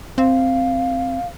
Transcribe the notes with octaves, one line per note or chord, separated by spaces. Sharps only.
C4 F5